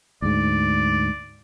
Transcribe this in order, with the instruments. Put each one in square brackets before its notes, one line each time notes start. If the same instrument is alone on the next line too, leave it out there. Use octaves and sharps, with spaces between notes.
[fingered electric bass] D2 G#2 [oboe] D5